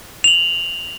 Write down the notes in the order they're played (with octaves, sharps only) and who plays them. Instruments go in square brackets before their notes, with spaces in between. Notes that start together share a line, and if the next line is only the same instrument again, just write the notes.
[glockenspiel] F7 F#7